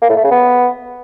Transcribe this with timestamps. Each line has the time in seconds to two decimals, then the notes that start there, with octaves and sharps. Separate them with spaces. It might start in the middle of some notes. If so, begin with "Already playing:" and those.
0.02 A#3
0.09 A2
0.16 A3
0.24 C#3
0.31 B3